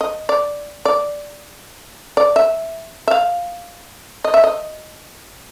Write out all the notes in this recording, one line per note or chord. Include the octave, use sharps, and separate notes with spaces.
D#5
D5
D5
D5
E5
E5
F5
D#5
E5
D#5